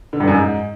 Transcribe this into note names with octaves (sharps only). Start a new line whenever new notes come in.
D3
G2
F#2
G#2